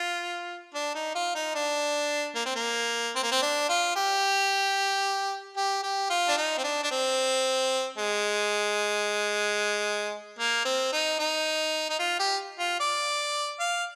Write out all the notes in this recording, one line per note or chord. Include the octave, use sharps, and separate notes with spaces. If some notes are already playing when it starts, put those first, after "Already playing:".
Already playing: F4
D4
D#4
F4
D#4
D4
A#3
C4
A#3
C4
A#3
C4
D4
F4
G4
G4
G4
F4
D4
D#4
C4
D4
D4
C4
G#3
A#3
C4
D#4
D#4
D#4
F4
G4
F4
D5
F5